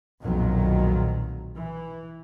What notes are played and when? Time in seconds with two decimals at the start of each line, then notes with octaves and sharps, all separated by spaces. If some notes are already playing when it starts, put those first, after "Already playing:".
0.21 B1 F2 A#2 D#3 F#3
1.54 E3